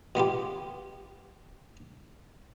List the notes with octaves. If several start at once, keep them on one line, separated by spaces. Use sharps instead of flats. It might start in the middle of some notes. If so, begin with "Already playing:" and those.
B2 B3 F4 G4